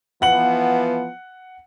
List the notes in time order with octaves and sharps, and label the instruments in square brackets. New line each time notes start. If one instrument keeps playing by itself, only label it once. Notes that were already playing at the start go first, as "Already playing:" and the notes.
[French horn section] E3 F3 B3 [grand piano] F#5 F#7